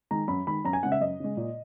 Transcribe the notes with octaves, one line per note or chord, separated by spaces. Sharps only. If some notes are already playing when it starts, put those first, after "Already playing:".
D#3 G#3 A#5
F#2 B5
D#3 G#3 B5
F#2 A#5
G#5
C#3 G#3 F#5
E5
F#2 D#5
C#3 G#3
A#2